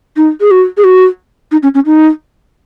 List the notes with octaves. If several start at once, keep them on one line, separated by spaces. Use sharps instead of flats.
D#4
G#4
F#4
G#4
F#4
D#4
C#4
C#4
D#4